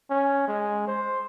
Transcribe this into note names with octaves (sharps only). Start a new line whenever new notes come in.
C#4
G#3
C5